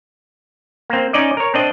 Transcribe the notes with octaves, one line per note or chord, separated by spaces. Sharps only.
A#3 C4
C#4 D#4 D5 D#5
A#4 C#5
C4 D4 D#5